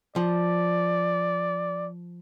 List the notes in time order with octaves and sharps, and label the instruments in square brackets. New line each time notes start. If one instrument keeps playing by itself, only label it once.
[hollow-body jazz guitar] F3 [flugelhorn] D5